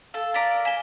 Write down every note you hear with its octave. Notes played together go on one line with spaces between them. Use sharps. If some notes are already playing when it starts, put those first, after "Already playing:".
A4 F5
A#4 D5 A6 B6 D7
G#5 B6 E7 G7